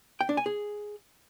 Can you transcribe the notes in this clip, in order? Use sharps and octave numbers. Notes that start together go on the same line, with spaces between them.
G5
D4
G#5
G#4